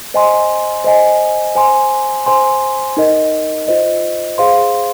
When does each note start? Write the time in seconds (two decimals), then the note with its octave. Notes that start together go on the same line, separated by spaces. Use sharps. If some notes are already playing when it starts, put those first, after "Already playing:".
0.14 C5 D#5 G#5 C6
0.84 C5 D#5 G#5
1.55 C5 G#5 C6
2.26 C5 G#5 C6
2.97 D#4 A#4 D#5
3.68 F4 C5 D#5
4.38 G#4 C5 F5 C6